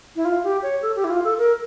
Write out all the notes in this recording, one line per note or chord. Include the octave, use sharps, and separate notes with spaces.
E4
F4
G4
C#5
A4
G4
E4
F4
A4
A#4